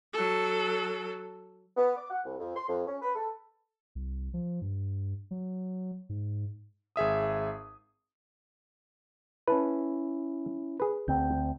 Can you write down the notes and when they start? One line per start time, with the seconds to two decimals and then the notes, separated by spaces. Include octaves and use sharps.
0.13 F#3 A4
1.77 B3
1.96 D6
2.09 F#5
2.25 C2
2.39 F2
2.55 C6
2.68 F2
2.87 C#4
3.02 B4
3.15 A4
3.95 C2
4.34 F3
4.61 G2
5.31 F#3
6.09 G#2
6.96 G#1 G#4 E5 D#6
9.48 C#4 E4 B4 A5
10.80 G#4 B4
11.08 D2 C4 G6